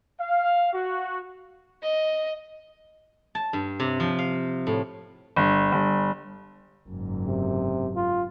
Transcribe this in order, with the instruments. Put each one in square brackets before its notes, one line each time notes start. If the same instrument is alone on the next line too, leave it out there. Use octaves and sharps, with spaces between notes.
[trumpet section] F5
F#4
[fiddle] D#5
[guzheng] A5
G2
C3
F3
F5
A2
[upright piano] G1
G1
[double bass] F#1 G#2
[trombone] C3
F4